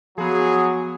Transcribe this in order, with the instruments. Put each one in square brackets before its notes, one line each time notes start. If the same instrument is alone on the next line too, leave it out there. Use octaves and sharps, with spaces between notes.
[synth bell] F3 B3 [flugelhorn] F#3 [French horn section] F#4 [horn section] G#4